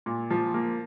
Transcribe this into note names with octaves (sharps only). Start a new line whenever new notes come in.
A#2
F3
A#3